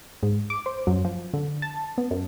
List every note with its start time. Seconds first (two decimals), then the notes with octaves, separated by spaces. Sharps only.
0.23 G#2
0.50 D6
0.66 C5
0.87 F#2
1.05 F3
1.34 D3
1.62 A5
1.98 B3
2.11 F#2